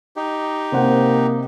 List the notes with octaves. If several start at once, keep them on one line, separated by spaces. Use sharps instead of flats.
D#4 G4
C3 A#3 C5 F#5